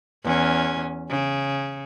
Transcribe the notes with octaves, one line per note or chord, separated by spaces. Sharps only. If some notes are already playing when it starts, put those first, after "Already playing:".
E2 C#4
C#3